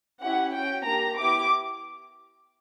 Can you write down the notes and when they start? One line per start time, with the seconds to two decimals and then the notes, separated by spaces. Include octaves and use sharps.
0.21 C#4 E4 G4 F#5
0.53 C#4 F#4 G5
0.85 A#3 D4 G4 A#5
1.17 B3 E4 G4 D6